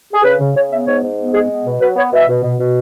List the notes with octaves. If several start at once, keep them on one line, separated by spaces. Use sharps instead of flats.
G#4
C#3 B4
C#3
C#3 C#5
B3 E5
G#2 C#5
G#2
B3
G#3 G#4
B3
B2
F#3 B4
B3 C#5
B2 E5
B2
B2
B2